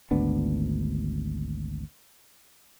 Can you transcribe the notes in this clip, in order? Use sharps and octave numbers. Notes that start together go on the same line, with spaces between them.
G#1 D2 B3 D4